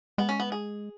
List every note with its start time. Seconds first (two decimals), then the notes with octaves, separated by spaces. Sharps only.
0.18 G#3 B3
0.29 C#4
0.40 B3
0.52 G#4